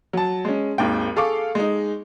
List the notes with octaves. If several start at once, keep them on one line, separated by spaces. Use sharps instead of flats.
F#3 A5
G#3 C#4
G#1 D#2 G#3 G5
G#4 A4 F5 C#6 D6
G#3 D#4